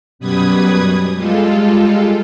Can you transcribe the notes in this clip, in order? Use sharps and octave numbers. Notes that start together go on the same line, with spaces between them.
F#2 B2 G3 B4 D#6 G#6
G3 G#3 F4 A4